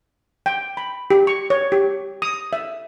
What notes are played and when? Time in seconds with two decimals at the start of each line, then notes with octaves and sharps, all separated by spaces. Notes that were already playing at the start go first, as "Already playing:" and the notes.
0.46 G5
0.77 B5
1.10 G4
1.27 C#6
1.50 C#5
1.72 G4
2.22 D#6
2.53 E5